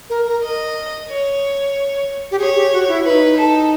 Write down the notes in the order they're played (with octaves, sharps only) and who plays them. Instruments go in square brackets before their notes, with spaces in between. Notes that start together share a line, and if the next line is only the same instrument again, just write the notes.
[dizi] A#4
A#4
[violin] D#5
C#5
[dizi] G4
[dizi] G#4 [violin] C#5
[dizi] G4
F#4
E4
[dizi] E4 [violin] B4
[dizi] D#4
[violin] A4